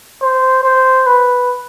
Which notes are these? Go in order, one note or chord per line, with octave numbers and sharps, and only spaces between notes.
C5
C5
B4